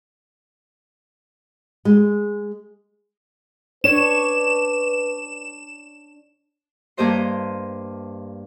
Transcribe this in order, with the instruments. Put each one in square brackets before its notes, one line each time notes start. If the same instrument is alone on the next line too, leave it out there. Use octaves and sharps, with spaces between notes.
[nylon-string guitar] G#3
[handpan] D4 C#5 [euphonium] B4 [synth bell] E7
[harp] G2 A#3 G4 C5 D#5 C6